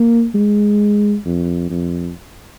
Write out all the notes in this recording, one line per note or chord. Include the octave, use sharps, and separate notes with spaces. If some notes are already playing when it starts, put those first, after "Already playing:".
Already playing: A#3
G#3
F2
F2